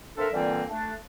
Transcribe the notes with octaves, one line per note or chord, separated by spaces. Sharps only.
A#3 C4 D4 A4 A#4 E5
A#2 D3 E3 G3 A#3 C4
A3 D4